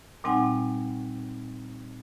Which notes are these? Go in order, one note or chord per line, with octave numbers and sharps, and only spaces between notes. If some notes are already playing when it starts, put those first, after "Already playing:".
A#2 G3 C4 D#4 F#5 G#5